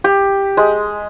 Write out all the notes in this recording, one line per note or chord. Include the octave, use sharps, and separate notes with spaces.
G4
G#3